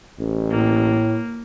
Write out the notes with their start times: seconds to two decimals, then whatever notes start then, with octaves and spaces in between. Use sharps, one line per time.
0.20 A1
0.51 A2 A#3